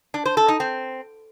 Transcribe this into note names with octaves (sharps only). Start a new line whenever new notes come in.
D4
C5
A4
D#4
C4